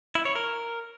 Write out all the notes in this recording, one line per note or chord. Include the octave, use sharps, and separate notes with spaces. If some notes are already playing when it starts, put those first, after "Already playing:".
E4
C#5
A#4